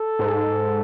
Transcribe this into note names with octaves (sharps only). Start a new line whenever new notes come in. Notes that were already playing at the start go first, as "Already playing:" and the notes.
Already playing: A4
G#2